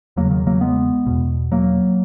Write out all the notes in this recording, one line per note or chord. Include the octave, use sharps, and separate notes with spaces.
E2 C#3 F#3 A#3
D#3 F#3
F#3 A#3
G#3 B3
E2 B2
F#3 A#3